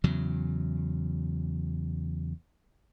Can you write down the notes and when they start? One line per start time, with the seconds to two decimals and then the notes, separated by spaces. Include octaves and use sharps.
0.04 E2 C#3 F#3